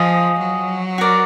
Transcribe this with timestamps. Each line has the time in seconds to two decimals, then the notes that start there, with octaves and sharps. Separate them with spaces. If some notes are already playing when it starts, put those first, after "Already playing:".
Already playing: F3 F4 G#4 D#5
0.40 F#3
0.98 F#4 A#4 D5